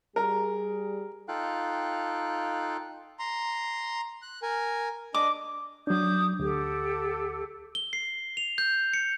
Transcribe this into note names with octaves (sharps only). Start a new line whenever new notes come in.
G3 G#4 A#4
D#4 F4 A4 F5 G5 F#6
A#5 C6
F#6
A#4 G#5
D4 D#5 D6
F#3 D4 D6 D#6 G6
D2 G4 A4 F#5
G7
C7
F7
G6
C#7